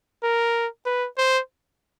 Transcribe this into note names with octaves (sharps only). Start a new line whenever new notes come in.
A#4
B4
C5